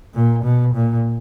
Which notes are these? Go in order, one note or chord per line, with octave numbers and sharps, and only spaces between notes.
A#2
B2
A#2